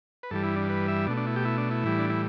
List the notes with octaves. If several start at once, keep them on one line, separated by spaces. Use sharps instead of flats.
B4
G2 E3 G3 A4
E4
D4
B4
E5
B2 A3 D4
D4
E4
G4
E4
D4
E4
A2 E3 G3
D4
E4